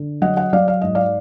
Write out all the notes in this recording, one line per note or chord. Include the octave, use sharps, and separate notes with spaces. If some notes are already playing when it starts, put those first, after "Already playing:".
Already playing: D3
F#3 D#5 F#5
D#5 F#5
F#3 D5 F5
F5
G#2 D#5
D5 F5